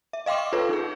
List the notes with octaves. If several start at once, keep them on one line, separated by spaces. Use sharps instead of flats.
E5
D#5 F5 G5 C6 D6
C#6
F4 A4 B4 C#5
D#4 G#4